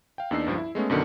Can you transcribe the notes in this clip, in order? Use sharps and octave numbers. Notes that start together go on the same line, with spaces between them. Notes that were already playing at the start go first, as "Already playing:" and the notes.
F5 G5
E2 A#3 D4 D#4 E6 C7
C#2 G2 F3
E4
G#3 A3 B3 C#4
F#2 B2 D3 D#3